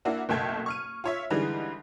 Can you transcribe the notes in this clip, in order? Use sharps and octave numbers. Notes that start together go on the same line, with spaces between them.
A#3 D4 E4 F#4
F#1 B1 A3 G5 A5 G#6
C#6 F6 D#7
F4 C#5 E5
D3 E3 G3 G#3 D#4